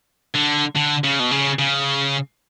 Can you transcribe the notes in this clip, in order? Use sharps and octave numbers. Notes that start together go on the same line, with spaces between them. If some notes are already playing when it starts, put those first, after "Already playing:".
D3
D3
C#3
B2
C#3
C#3